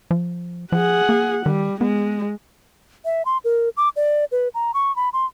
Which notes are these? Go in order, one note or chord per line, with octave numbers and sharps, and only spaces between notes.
F3
F3 G#4 F#5
A#3
D#3 G3
G#3 B3
E5
C6
A#4
D6
D5
B4
A#5
C#6
B5
C6